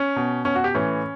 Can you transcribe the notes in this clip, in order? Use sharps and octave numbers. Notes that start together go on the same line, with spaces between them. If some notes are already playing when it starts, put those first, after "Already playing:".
Already playing: C#4
B2
B2 C#4
F#4
G4
A2 E3 C#4